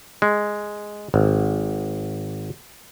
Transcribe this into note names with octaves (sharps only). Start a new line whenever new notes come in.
G#3
G#1